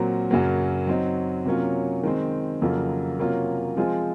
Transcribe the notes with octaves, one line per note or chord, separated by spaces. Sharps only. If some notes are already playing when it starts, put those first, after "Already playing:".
Already playing: A#2 F#3 C4 F#4 A#4
F#2 C#3 F#3 A#3
F#3 C4 D#4
C3 F#3 A#3 C#4 F4
D#3 G#3 C4
F2 C#3 F#3 A#3 F4
C3 F#3 A#3 C#4 F4
F3 G#3 C4 F4 G#4